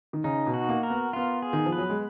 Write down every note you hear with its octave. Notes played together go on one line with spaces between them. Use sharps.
D#3
C#3 D#4
B2
F#4
A#3
A#4
B3
B3 F4
G#4
D#3
F3
B4
F#3
G#3